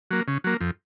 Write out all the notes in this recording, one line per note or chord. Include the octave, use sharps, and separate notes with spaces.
F#3 A#3
C#3
F#3 A#3
F2